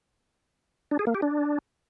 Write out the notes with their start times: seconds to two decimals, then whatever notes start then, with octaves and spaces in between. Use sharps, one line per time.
0.91 D4
0.99 G#4
1.07 A#3
1.15 G4
1.22 D4